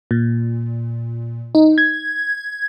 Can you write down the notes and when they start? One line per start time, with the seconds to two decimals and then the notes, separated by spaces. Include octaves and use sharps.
0.11 A#2
1.55 D#4
1.78 G#6